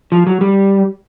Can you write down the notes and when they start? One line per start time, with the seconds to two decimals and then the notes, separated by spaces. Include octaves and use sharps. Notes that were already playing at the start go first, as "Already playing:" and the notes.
0.12 F3
0.27 F#3
0.41 G3